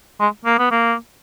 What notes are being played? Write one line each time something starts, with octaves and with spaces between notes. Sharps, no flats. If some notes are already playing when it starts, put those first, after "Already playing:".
G#3
A#3
B3
A#3